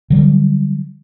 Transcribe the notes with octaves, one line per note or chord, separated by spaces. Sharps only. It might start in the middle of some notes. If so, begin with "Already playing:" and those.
D3 F#3 G3